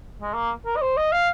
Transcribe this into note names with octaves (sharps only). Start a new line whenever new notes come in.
G#3
A#3
A#4
D#5
C5
D#5
F5